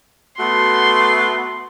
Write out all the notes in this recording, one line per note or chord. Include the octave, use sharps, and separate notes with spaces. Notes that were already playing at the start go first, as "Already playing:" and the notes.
A3 B3 F#4 C6